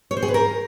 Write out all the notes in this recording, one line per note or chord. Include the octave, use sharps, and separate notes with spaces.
C#5
C5
G#4
B4
A#4